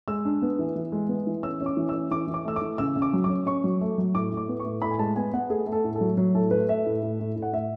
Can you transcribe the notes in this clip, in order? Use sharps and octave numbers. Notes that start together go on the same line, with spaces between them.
G#3 E6
D4
B3
E3
E3
G#3
B3
E3
C#4 E6
C#4
D6
E3
C#4 E6
E3 D6
E3
D6
A3 E6
D6
E3
C#3 E6
C#3
D6
F#3
D6
C#4
C#4 C#6
F#3
A3
F#3
A2 D6
A2
D6
B3
C#6
A2
A2 B5
G#5
G#3 A5
B3 G#5
B3 F#5
A3 G#4
A3
A4
A2
A4
F#3
F#3
A2 A4
A3 B4
A3 E5
A2
A2
A2
A2
F#5
A2 E5